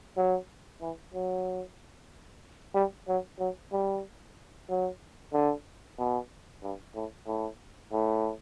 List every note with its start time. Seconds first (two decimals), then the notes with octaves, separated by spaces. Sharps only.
0.17 F#3
0.81 E3
1.14 F#3
2.74 G3
3.08 F#3
3.39 F#3
3.72 G3
4.69 F#3
5.33 D3
5.98 B2
6.63 G2
6.95 A2
7.27 A2
7.92 A2